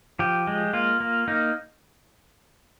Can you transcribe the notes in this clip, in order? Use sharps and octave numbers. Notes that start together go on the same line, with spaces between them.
F3 G4
G#3
A#3 F4
A#3
A#3 D#4